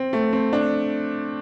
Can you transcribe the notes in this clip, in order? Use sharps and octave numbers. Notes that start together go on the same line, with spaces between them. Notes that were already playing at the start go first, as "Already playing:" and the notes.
Already playing: C4
A3
C4
D4